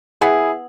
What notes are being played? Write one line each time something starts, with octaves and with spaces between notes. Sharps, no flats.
B3 E4 G#4